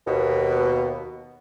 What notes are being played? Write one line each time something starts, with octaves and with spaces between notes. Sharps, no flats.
D#2 B2